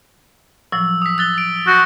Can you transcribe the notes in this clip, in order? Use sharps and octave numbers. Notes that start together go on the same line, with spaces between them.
A2 F3 F#3 E6
D#6 B6
E6 F#6 A6 G7
A6 D7
F#4 C#6 G6 A#6 C#7